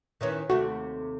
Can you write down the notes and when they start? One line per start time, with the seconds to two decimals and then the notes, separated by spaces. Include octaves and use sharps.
0.21 D#3 E3 C#4
0.50 D#2 C3 A3 F#4